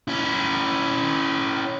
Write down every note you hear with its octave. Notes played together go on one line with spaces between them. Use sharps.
C#4 E4